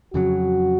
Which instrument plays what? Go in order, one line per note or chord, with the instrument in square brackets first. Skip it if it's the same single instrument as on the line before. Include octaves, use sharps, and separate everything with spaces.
[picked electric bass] F2 C#3 F#3 [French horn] F#4